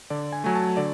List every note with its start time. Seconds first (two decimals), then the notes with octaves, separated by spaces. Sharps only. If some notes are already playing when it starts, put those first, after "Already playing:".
0.10 D3 D5
0.32 G#5
0.44 F#3 A3 G#5
0.55 A5
0.77 D3 D5